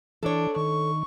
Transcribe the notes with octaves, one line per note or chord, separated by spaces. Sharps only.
E3 D4 A4 C#5
D#3 C#6